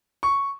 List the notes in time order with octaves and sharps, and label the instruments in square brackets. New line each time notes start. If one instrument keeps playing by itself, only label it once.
[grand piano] C#6